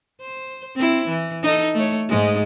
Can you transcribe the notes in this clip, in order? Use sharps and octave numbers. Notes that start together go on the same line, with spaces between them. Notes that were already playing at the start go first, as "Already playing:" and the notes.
C5
C4 E4
E3
D#4 A4
A3 C#5
G#2 G#3